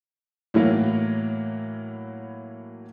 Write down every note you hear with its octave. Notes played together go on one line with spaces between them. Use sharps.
A2 E3 F#3 A#3